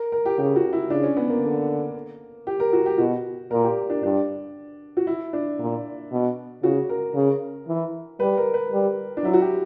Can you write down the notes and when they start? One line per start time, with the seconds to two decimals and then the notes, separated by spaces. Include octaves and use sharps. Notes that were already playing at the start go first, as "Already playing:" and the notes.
Already playing: A#4
0.12 A#4
0.26 G4
0.38 C#3 G4
0.56 F#4
0.73 E4
0.90 C#3 D4
1.03 C#4
1.17 B3
1.29 A#3
1.42 D3
2.47 G4
2.60 A#4
2.73 F#4
2.86 G4
2.98 B2 F#4
3.51 A#2 A#4
3.64 G4
3.90 D4
4.03 G2 D4
4.97 F#4
5.07 E4
5.33 D4
5.59 A#2
6.12 B2
6.63 C#3 F#4
6.89 A#4
7.15 C#3
7.68 E3
8.20 G3 B4
8.38 A#4
8.54 B4
8.72 G3
9.17 D4
9.23 F#3 E4
9.33 F#4
9.41 G4